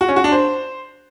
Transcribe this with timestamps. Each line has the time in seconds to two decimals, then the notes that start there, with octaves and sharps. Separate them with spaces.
0.01 F#4
0.09 C#4
0.16 F#4
0.24 D4
0.32 C5